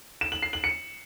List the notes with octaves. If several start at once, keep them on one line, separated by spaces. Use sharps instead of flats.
E7
F#7
C7
F#7
C#7